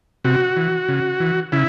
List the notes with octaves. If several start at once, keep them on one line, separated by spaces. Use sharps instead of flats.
C3 F#4
E3
C#3
E3
C#3 E4